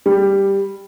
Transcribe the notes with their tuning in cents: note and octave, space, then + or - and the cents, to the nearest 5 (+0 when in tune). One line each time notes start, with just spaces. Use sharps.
G3 +5